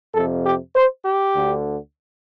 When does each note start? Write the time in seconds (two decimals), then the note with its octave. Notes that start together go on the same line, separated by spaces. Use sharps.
0.15 F2 C3 A4
0.44 G4
0.75 C5
1.05 G4
1.35 D2 D3